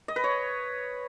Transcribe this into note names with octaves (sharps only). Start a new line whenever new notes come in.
D#5
B4
C#5